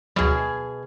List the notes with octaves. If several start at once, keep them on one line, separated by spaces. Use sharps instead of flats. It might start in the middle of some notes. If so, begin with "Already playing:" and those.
D2 B2 F#3 G#4